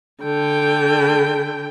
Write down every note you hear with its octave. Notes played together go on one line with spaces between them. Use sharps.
D3 G5